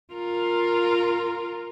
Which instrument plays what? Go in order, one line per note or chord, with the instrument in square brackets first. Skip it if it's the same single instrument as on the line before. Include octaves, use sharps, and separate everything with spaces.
[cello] F4 A#4